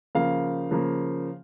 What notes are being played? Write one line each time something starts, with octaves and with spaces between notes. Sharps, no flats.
C#3 F3 A#3 F5
C#3 F3 A#3